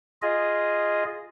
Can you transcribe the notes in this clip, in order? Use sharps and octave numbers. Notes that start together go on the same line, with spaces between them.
F4 G#4 D#5